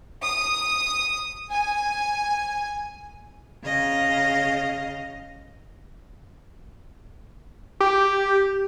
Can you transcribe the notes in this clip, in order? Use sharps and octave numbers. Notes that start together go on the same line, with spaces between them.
D#6
G#5
C#3 D#5 F5
G4